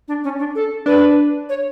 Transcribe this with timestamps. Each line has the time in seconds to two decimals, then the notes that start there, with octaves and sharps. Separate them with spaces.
0.08 D4
0.24 C#4
0.39 D4
0.55 A4
0.86 D4 B4
1.49 C#5